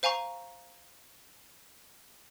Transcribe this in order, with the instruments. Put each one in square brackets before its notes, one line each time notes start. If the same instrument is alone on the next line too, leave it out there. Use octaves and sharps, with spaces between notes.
[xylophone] C5 F5 G#5 A#5 C#6